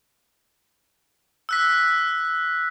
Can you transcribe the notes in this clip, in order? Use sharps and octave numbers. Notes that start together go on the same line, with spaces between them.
E6 F#6 B6